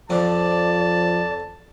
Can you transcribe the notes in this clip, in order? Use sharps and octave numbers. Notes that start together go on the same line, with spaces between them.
F2 F3 D5 A5